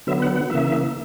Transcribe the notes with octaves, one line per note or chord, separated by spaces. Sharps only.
D3 F#3 B3 E5
F#5
F#5
C#3 E3 A#3 E5